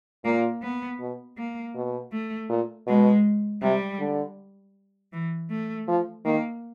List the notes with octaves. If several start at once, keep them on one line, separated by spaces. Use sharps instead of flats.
A#2 A#3
B3
B2
A#3
B2
A3
A#2
B2 G#3
C3 G3
D3
E3
A3
F3
D#3 A#3